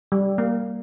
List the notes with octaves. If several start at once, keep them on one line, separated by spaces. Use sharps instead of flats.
G3
A#3